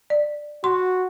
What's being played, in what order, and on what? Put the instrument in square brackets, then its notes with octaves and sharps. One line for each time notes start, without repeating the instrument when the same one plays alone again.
[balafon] D5
[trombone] F#4 [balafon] C6